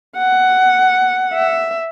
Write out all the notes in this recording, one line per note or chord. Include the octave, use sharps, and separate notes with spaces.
F#5
E5